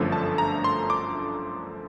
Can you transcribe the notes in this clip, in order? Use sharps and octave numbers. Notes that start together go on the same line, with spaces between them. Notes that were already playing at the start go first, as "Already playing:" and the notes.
Already playing: G1 F#2 D3 F3 A3
A5
A#5
C6
D6